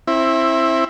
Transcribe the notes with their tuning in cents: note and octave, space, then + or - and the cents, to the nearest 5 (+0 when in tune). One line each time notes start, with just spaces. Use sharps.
C4 +30 E4 +0